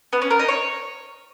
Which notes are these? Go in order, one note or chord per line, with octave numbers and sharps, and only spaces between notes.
B3
C#4
A#4
D#4
C#5